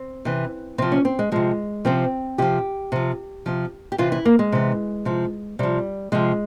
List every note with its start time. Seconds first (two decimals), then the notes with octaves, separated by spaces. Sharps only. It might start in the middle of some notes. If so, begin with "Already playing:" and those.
Already playing: C4
0.25 C3 E3
0.78 C3 F3 C4
0.92 C#4
1.05 C4
1.19 G#3
1.32 C3 F3 G#3
1.85 C3 F3 C4
2.38 C3 F3 G4
2.92 C3 F3
3.46 C3 F3
3.92 G4
3.98 C3 E3 F4
4.12 E4
4.25 A#3
4.39 G#3
4.52 C3 E3
5.05 C3 F3
5.59 C3 F3 G3
6.12 C3 F3 G#3